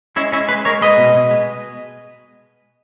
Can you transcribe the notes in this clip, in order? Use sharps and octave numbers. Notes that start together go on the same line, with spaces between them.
G#3 C#4 E4
G#3 C#4 E4
G#3 G#4 B4
G#3 A#4 C#5
G#3 B4 D#5
B2
B2
G#3